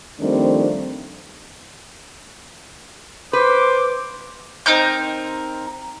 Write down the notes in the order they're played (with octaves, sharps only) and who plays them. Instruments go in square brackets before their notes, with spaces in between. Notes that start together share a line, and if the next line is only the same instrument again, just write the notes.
[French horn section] D#3 F3 G3 A3 C4 D4
[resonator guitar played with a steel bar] B4 [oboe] C5 [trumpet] D6
[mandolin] C4 D#4 A#4 G6